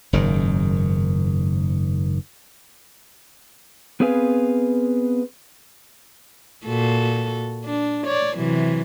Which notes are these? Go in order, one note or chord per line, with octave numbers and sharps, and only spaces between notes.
F#1 G#2 D#3
B3 C4 G#4 B4 F5 G#5
A#2 F#4 A4
D4
C#5 D5
C3 E3 F#3